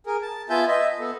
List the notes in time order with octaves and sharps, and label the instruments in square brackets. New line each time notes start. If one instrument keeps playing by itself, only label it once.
[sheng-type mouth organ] G#4 A#4
A5
B3 F4 E5 G#5 A5 G6
D#5 E5
B3 A4